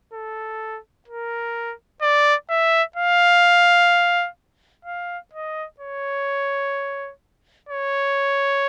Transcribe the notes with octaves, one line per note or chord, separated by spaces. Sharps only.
A4
A#4
D5
E5
F5
F5
D#5
C#5
C#5